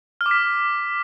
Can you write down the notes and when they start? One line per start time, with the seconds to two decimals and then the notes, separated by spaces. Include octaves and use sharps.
0.21 F6
0.26 D6
0.31 B6